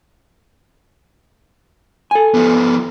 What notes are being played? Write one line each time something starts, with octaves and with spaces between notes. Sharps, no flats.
A4 G#5
F3 B3